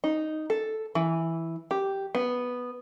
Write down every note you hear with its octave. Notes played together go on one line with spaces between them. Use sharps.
D#4
A4
E3
G4
B3